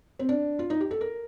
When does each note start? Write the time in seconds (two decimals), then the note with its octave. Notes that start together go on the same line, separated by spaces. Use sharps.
0.19 C4
0.29 D4
0.59 F4
0.70 D#4
0.80 G4
0.91 A4
1.01 A#4